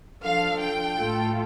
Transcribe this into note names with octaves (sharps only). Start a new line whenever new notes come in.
F3 D4 A4 F5
G5
A2 A3 F4 A4